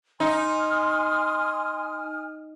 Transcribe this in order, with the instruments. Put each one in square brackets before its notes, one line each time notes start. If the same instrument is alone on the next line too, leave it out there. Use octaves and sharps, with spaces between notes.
[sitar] D#4 [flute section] G#5 D#6 F6 [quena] C6